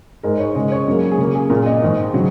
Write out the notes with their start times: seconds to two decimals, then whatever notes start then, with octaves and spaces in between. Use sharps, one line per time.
0.23 G#2 G#3 A#4
0.39 C#5
0.55 C#3 G#3 D#5
0.72 C#5
0.88 F#2 F#3 A#3
1.12 G#4
1.18 C#3 A#3 A#4
1.35 G#4
1.50 A#2 A#3 A#4
1.66 D#5
1.82 G#2 D#3 G#3
2.14 C#3 F#3